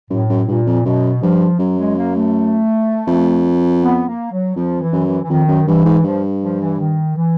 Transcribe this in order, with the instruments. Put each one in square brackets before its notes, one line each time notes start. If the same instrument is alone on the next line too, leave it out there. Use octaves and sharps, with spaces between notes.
[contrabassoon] F#2 [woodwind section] A2
[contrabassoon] F#2
[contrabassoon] G2 [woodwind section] A#2
[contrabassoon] F2
[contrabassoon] F#2 [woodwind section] B2
[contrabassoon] G2 [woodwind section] F3
[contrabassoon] F#2 [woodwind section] F#3
[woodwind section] G#3
A#3
A3
[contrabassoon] F2
[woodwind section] B3
A#3
F#3
[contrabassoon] F2 [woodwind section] F3
[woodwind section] E3
[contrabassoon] F#2
[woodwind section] E3
E3
[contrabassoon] F2 [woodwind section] D#3
[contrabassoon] F#2
[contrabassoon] G2 [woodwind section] E3
[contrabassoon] G#2
[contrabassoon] G2 [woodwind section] F3
[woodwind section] F3
E3
D#3
E3